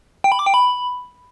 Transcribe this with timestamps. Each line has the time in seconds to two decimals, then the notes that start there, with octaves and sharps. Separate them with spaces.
0.24 G5
0.32 B5
0.39 D6
0.46 G5
0.54 B5